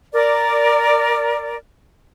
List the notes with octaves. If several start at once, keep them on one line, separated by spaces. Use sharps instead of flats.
A#4 D5